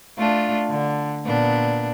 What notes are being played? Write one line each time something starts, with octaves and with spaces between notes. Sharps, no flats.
A3 D4 F4
D3
A#2 B3 D4